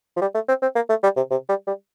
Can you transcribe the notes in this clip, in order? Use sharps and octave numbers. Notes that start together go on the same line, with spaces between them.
F3
G3
A3
C4
C4
A#3
A3
G3
C3
C3
G3
G3